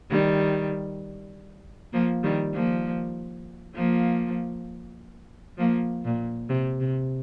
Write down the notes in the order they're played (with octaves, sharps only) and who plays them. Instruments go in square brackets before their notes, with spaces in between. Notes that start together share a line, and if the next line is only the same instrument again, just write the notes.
[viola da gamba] D#3 G3
F3 A#3
D#3 G3
F3 A#3
F3 A#3
F3 A#3
A#2
C3
C3